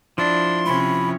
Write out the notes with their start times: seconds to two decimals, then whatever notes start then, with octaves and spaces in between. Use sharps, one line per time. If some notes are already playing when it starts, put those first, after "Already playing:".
0.18 F3 D4 E4 C6
0.66 C3 C#4 B5